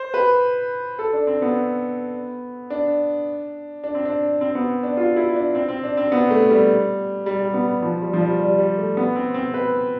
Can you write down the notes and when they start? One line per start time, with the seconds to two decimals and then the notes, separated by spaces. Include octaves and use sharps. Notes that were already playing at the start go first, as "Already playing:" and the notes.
Already playing: C5
0.14 B4
0.99 A4
1.13 D4
1.27 C4
1.42 B3
2.70 D4
3.84 D4
3.94 C4
4.05 D4
4.41 C4
4.55 B3
4.83 D4
4.97 F4
5.16 E4
5.36 D4
5.55 C4
5.68 C4
5.83 D4
5.97 C4
6.12 B3
6.31 A3
6.50 G3
7.26 G3
7.40 G3
7.54 B3
7.82 F3
8.02 G3
8.13 F3
8.21 G3
8.39 G3
8.58 G3
8.78 A3
8.97 B3
9.16 C4
9.34 C4
9.54 B4